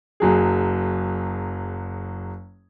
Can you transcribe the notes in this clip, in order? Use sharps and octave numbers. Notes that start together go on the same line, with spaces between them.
F#1 F#3 G#4